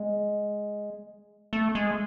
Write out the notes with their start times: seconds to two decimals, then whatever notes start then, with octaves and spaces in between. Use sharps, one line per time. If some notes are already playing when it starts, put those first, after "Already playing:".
Already playing: G#3
1.53 A3
1.75 G#3